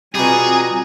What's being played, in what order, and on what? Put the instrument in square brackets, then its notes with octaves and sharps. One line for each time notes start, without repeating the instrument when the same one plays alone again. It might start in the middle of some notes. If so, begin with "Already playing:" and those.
[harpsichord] B2 G3 [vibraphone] C4 F4 [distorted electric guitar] G#4 [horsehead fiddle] G#5 A#5